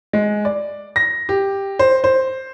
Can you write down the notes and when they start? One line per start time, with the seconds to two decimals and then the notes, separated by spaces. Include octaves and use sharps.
0.13 G#3
0.45 D5
0.96 A#6
1.29 G4
1.79 C5
2.04 C5